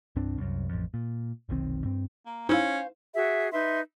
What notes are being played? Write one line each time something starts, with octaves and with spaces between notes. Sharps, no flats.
C2 G2 C4 D4
C2 F#2
A1 F2
A#2
F1 B1 D#3 C4
G2 C4
A#3
C#4 D#4 E4 C5 F5
F#4 G#4 E5
D#4 B4 E5 C6